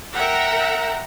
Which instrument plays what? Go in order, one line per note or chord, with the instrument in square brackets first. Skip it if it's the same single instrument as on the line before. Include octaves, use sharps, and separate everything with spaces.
[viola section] A#4 E5 F#5 G5 A#5